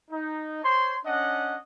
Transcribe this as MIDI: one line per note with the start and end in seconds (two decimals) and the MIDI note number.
0.11 0.62 63
0.63 0.95 72
0.63 0.95 73
0.63 0.95 84
1.05 1.56 61
1.05 1.56 62
1.05 1.56 75
1.05 1.56 78